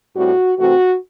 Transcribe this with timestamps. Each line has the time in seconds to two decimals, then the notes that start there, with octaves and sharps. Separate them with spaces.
0.16 A2 G3 C4 F#4
0.57 C3 E3 A3 C4 F#4